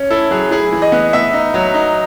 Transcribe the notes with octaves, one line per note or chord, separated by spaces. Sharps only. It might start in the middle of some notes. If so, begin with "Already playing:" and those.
Already playing: C#4
E4 A4
F#3 G#4
E4 G#4
E3
D#5
B3
B3 E5
D#4
F#3
D#4